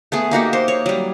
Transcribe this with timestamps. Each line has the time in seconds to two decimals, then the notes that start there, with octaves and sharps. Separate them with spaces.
0.12 A3 B3 G#4
0.31 A#3 D#4 F#4 G4
0.53 C5
0.68 C#5
0.86 F#3 G3